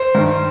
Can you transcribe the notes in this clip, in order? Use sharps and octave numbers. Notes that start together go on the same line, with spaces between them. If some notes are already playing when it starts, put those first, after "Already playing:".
Already playing: C5
G2 D#3